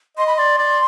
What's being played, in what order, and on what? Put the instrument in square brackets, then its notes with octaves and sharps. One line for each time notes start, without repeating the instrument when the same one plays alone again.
[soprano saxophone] D#5 [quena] C6
[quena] B5
[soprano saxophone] D5 [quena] C6
[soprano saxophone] D5